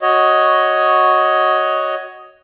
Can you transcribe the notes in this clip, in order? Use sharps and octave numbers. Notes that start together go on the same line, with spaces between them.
F#4 C#5 D#5